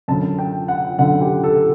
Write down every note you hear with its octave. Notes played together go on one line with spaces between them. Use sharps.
F#2 D3 A5
G5
F#5
F#2 D3 F#5
G4
A4